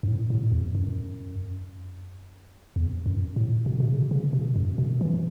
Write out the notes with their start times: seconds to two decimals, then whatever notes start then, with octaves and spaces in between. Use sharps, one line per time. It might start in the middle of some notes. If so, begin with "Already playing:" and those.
0.03 F#2
0.08 A2
0.30 A2
0.52 E2
0.75 F#2
2.76 E2
3.06 F#2
3.36 A2
3.66 B2
3.80 B2
3.88 C#3
4.11 C#3
4.33 B2
4.56 F#2
4.78 B2
5.01 E3